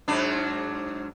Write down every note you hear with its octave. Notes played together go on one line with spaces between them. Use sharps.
G#2 F#3 D4